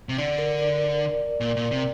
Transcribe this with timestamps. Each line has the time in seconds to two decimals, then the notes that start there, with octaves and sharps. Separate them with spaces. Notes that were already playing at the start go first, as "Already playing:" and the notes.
0.09 C3
0.18 D3 D5
0.38 A#4
0.58 D5
1.40 A#2
1.56 A#2
1.71 C3